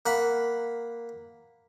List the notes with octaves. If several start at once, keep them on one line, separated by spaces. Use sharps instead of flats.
A#3 F#5 B5